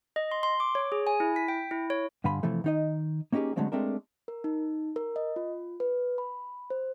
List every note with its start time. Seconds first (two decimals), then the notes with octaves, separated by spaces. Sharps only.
0.16 D#5
0.31 C6
0.43 C6
0.60 D6
0.75 C#5
0.92 G#4
1.07 G#5
1.20 E4
1.36 B6
1.48 G5
1.71 E4
1.90 C#5
2.24 G2 D3 F5 G#5 B5 C6
2.43 C3 E3 F3 A3
2.64 D#3 D#4 D#5
3.32 A#3 C#4 D#4 G4 G#4
3.56 D3 F#3 G#3 A3 C4 D4
3.72 G#3 A3 C4 D4 A#4
4.28 A#4
4.44 D#4
4.96 A#4
5.16 D#5
5.36 F4
5.80 B4
6.18 B5
6.70 C5